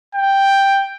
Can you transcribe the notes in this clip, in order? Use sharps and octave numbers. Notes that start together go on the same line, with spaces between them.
G5